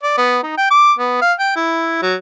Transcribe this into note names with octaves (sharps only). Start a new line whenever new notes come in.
D5
B3
D#4
G5
D6
B3
F5
G5
E4
F#3